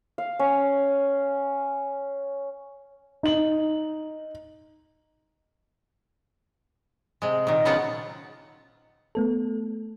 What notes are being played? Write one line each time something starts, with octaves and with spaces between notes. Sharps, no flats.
F5
C#4
D#4 F#7
C3 G#3
A#2 D#3
C#3 F#3 B3 F4 F#5 A5
A3 B3 A4